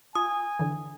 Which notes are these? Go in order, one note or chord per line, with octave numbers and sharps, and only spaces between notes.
F4 G#5 D#6
D3 E3